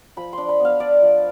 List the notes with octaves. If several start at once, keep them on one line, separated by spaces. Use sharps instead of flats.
F3 B5
D4 C6
B5
B3
F5
D4 D5
F3